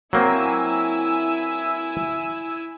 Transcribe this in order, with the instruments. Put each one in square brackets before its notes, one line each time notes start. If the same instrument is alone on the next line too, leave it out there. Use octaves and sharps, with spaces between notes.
[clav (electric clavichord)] F#3 A#3 C4 [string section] E4 G#5 E6